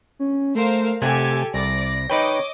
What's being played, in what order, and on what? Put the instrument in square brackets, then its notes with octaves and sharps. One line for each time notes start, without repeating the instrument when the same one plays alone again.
[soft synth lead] C#4
[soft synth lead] A3 [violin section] A#4 C5 F5
[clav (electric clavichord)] C3 A3 F#5 [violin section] G4 A4 G#5 [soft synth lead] G#6
[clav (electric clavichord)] C2 [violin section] D5 [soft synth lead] A#6
[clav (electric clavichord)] D#4 B4 G5 [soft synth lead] C#5 [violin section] D#5 D6